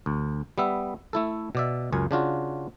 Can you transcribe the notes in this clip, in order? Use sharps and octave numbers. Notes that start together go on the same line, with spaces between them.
D2
G3 B3 E5
A3 E4 A4
B2 D5 E5
C#2 F#2 G#5
C#3 D4 F4 F#4